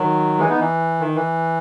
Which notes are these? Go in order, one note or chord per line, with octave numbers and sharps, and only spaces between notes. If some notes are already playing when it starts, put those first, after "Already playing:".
Already playing: D#3 F#3
E3 G#3
B3 D#4
E3
D#3
E3